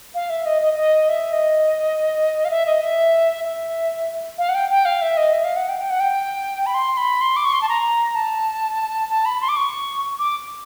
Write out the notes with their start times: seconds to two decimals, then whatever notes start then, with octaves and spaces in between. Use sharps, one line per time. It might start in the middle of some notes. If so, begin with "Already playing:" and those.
0.15 F5
0.30 E5
0.46 D#5
0.62 D#5
0.77 D#5
1.09 E5
1.33 D#5
2.45 F5
2.50 E5
2.66 D#5
2.82 E5
3.44 E5
4.38 F5
4.49 F#5
4.55 G5
4.70 G5
4.85 F5
5.02 E5
5.17 D#5
5.33 E5
5.44 F5
5.56 F#5
5.69 G5
5.79 G5
5.90 F#5
6.00 G5
6.66 B5
6.74 C6
6.97 B5
7.21 C6
7.36 D6
7.45 C#6
7.53 C6
7.62 A5
7.69 A#5
8.15 A5
9.09 A5
9.26 B5
9.41 C6
9.49 D6
9.57 C#6
10.19 D6